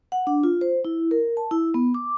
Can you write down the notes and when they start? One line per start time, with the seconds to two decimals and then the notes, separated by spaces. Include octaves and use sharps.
0.12 F#5
0.27 D4
0.44 F4
0.61 C5
0.85 E4
1.11 A#4
1.37 A5
1.51 E4
1.74 B3
1.94 D6